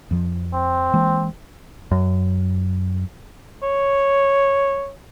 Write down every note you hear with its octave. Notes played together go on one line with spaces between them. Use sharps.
F2 F3
C4
E3 G#3 A#3
F#2
C#5